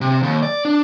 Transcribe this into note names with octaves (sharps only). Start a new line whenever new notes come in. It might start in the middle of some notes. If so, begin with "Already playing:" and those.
C3
D#2
D5
D4